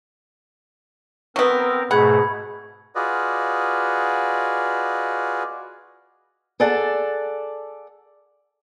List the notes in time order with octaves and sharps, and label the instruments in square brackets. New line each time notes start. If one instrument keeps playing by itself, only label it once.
[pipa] F#3 B3 [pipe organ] C4 A#4
[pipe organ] G#2 B2 A3 [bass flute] G#4 [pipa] F#5 [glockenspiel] B5 G#6
[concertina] F4 F#4 G#4 B4 D5 D#5
[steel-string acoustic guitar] G#4 A4 D5 F#5 A5